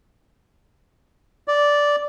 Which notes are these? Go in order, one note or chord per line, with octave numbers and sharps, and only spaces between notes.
D5